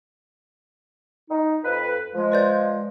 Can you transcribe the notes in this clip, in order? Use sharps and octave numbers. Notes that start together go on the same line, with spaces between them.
D#4
F2 B4
F3 G#3
B4 D5 G6